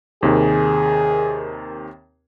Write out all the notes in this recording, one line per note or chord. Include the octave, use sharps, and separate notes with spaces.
D#2 C3 D#3 G#4